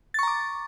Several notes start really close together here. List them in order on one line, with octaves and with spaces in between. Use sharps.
A6 C#6 A#5 D6